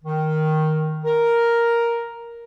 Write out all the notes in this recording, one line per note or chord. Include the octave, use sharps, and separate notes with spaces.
D#3
A#4